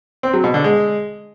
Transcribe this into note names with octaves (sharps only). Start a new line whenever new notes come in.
C4
F#3
B2
D3
G#3